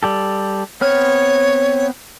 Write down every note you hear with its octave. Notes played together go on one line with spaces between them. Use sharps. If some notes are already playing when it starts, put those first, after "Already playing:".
G3 G4 A4
B3 C4 C#5 F6